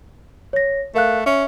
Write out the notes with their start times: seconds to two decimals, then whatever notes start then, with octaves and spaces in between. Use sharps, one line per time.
0.53 C#5 A#6
0.95 A3 A#4 F5 F#6
1.26 C#4 E5